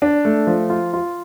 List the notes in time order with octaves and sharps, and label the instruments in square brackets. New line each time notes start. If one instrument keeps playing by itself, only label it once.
[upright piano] D4
A3
F3
F4
F4